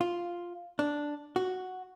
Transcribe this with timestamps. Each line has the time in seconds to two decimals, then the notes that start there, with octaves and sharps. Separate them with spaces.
0.01 F4
0.79 D4
1.36 F#4